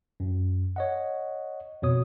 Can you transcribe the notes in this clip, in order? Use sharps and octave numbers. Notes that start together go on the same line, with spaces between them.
F#2
C#5 D#5 F#5
F2 B2 C#5 D#6